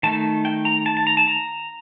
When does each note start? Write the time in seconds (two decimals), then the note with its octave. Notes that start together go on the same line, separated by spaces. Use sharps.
0.03 D#3 A3 D#4 A5
0.45 G5
0.65 A#5
0.86 A5
0.97 A5
1.07 A#5
1.17 A5
1.27 A#5